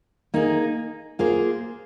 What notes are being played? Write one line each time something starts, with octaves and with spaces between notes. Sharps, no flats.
A#3 D#4 G#4
A#3 F4 G#4 C5